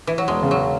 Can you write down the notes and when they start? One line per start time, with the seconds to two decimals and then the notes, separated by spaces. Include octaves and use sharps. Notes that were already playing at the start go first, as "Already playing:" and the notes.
0.07 E3
0.18 F#3
0.28 E1 G#3
0.43 C#3
0.51 F#3